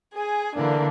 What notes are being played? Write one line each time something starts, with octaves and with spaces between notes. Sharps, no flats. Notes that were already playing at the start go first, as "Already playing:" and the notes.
G#4 G#5
D3 E3 A#3 D4